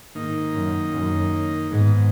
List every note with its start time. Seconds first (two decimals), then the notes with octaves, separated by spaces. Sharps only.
0.15 G#2 D#3 A#3 D#4
0.54 F#2
0.93 F#2
1.71 G#2 D#3 G#3 B3